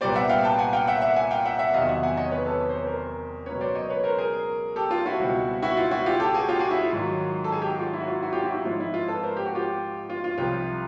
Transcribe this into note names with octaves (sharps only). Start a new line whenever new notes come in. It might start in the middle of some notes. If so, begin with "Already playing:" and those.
C2 A#2 G3 B3 C5 D5
E5 F#5
F5 G5
G5 A5
F#5 G#5
F5 G5
E5 F#5
E5 F#5
F#5 G#5
F5 G5
E5 F#5
E5 F#5
E2 C3 D#3 F#3 D#5 F5
E5 F#5
F#5 G#5
C#5 D#5
B4 C#5
A4 B4
C#5
C5
B4
A#4 C5
C#2 B2 F#3 A#3 C#4 B4 C#5
C5 D5
C#5 D#5
B4 C#5
A#4 C5
G#4 A#4
G4 A4
F4
E4 F#4
C#2 B2 G3 C4
E4 F#4
F4
E4 F#4
F4 G4
G4 A4
F#4 G#4
F4 G4
F#4 G#4
E4
F4
G#2 D#3 F#3
A4
G#4
G4
F#4
F4
E4
F#4
F4
E4 F#4
F4 G4
E4 F#4
E4
G#2 F3 G#3 C4 F4
E4
F4
A4 B4
A#4 C5
G4
F#4
F4 G4
F4
F4
C2 C3 F3 F4